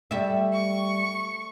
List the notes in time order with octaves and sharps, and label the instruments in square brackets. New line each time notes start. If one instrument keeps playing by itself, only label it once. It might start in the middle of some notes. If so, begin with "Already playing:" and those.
[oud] G3 E5 [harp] A3
[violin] C#6